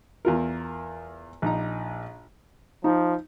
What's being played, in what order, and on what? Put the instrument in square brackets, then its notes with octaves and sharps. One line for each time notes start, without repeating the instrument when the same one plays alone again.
[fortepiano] E2 F4 A#4
A#1 D#4 A#5
[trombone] F3 [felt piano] D#4